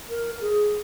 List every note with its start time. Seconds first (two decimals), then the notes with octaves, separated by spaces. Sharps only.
0.10 A#4
0.41 G#4